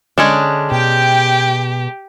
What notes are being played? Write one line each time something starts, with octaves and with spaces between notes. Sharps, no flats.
D3 G#3 C#4 D4
B2 G4 G5